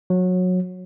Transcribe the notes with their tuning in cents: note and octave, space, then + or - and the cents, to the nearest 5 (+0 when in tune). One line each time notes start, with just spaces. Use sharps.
F#3 -20